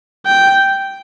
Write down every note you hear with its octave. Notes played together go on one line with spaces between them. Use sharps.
G5